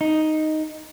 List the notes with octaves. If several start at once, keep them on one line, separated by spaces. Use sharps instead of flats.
D#4